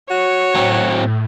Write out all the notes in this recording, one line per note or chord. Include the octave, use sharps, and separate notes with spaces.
F#4 C#5
A2 F#3 C4